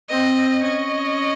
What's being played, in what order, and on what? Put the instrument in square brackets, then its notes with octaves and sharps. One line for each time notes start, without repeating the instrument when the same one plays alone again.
[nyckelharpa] C4 [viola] D#5
[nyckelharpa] C#4 [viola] D#5